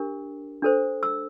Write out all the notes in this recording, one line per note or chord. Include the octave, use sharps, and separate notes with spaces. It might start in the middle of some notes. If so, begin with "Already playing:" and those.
Already playing: D4 G4 A#4
D4 A4 C5
E6